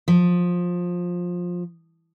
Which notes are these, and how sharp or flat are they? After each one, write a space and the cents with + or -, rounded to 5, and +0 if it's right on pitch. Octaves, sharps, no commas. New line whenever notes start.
F3 +20